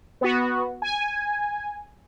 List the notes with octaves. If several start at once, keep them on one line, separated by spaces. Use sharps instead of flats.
B3 F#4
G#5